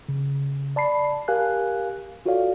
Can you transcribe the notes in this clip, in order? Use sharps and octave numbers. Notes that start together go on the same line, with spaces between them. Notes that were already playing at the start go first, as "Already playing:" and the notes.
C#3
D5 A5 B5 C7
G4 A#4 F5 G#5 F#6
F4 F#4 A4 C#5 D5 F5